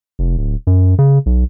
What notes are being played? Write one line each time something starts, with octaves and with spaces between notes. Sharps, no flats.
F1
D1
F#2
C#3
B1